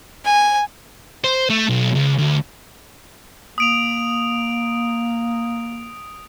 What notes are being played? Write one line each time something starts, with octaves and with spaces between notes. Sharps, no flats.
G#5
C5
A3
B1
C#2
D2
A#3 D#6 D7 F7